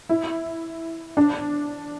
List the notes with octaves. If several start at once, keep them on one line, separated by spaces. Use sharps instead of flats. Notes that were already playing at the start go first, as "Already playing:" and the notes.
E4
D4